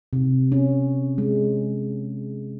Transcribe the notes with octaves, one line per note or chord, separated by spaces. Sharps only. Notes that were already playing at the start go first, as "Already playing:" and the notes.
C3
C#4
G#3